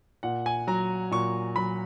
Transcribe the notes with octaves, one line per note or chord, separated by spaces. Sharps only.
A#2 F#5
G#5
F#3 A#5
A#2 C#6
F#3 B5